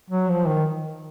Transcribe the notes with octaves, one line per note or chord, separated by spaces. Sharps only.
F#3
F3
D#3